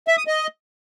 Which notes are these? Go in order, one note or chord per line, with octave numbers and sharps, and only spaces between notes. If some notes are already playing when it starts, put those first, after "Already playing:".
E5
D#6
D#5